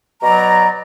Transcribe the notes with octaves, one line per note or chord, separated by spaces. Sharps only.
B2 F#3 D5 A#5